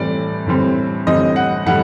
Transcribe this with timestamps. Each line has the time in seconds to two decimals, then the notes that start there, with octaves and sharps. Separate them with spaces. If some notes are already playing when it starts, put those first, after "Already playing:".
Already playing: A2 E3 G3 C4 D5
0.46 A2 E3 G3 C4
1.07 A2 E3 G3 C4 D#5
1.36 F#5
1.66 A2 E3 G3 F#5